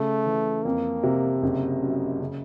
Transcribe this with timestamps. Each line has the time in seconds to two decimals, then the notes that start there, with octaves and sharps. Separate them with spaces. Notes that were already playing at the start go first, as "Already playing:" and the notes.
Already playing: C#3 A3
0.26 E3
0.65 F2 A#3
1.03 C3
1.43 F#1
1.82 F#2
2.21 C#3